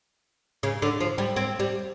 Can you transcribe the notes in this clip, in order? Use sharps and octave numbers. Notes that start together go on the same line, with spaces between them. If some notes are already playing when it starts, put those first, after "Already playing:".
C#3
D3
F3
G3
C4
G3